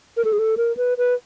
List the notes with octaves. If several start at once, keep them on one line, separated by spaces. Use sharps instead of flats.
A#4
A4
G#4
A4
A#4
B4
B4